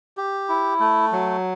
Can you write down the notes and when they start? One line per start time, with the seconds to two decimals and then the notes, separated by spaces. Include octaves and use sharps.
0.17 G4
0.49 E4
0.80 A3
1.12 F#3